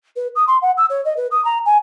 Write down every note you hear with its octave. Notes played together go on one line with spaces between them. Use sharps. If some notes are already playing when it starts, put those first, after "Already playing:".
B4
D#6
C6
F#5
E6
C#5
D#5
B4
D#6
A#5
G#5